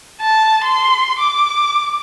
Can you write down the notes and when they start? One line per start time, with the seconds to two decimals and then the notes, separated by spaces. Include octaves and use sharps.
0.21 A5
0.64 C6
1.19 D6